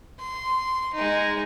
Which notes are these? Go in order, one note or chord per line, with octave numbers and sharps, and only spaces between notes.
C6
G#3 D#4